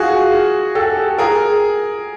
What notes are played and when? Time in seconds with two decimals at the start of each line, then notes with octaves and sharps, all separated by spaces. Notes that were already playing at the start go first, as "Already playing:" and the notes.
Already playing: F4 F#4 G#4
0.75 G4 A4
1.18 G#4 A#4